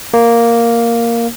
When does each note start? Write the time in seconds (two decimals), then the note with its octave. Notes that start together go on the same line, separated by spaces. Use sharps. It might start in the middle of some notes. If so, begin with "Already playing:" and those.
0.14 A#3